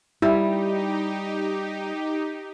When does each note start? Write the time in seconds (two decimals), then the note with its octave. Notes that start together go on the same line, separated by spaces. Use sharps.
0.22 G3 D#4 E4 G4